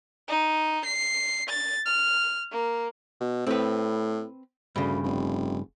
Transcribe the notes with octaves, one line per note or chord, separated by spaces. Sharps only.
D#4
C7
A6
F6
A#3
B2
A2 C4 B4
D2 G2 C#3
F1